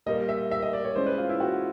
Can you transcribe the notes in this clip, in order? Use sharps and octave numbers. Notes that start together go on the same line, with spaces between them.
A#2 G3 A#3 D#5
E5
E5
D#5
D5
C#5
E3 G#3 C#4 C5
B4
F4
E4
F#4